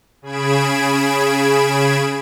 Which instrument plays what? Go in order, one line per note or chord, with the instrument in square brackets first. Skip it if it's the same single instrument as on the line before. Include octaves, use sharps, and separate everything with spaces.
[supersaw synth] C#3 G#4 B5 G#6 D7 E7